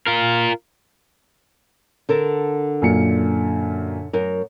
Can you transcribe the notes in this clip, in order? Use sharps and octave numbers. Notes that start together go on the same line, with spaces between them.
F4 A#4
D3 A4 A#4
F#2 A#2 C#7
F#2 A#4